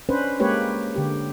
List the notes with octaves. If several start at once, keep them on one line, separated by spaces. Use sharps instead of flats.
C#4 D4 B4 C5
G#3 A#3 G4 B4 C#5
D3 G4